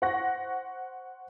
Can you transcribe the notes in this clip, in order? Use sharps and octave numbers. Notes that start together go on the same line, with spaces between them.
C5 F#5 C#6 F#6 A#6